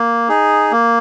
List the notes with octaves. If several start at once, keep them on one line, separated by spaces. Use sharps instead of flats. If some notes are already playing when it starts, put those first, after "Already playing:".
Already playing: A#3
D#4 G#4
A#3